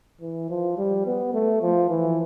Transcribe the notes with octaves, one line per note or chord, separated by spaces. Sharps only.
E3
F3
G3
B3
A3
F3
E3